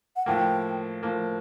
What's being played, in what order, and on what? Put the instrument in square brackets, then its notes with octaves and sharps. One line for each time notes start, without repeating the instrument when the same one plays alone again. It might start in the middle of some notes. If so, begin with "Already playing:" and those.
[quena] F#5
[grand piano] A2 F3 A#3 [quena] G5
[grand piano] A2 F3 A#3